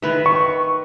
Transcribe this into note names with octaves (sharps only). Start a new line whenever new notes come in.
D#3 B4 E5
C#6